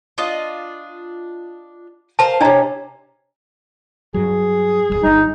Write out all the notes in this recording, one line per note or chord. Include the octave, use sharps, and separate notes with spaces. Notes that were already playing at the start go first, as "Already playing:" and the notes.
D4 F4 D#5
A#4 C5 F5 A5
C3 C#4 D4 D#5 A#5
G2 F#3 G#4
D1 C2 G3
G1 G3 D#4